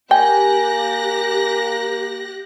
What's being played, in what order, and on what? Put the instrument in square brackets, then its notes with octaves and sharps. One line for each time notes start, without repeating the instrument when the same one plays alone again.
[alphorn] A#3 [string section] G4 F#6 A#6 [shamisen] G5 [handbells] G#5